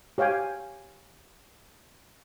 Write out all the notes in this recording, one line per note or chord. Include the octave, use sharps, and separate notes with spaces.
G4 C#5 F5 G5 G#5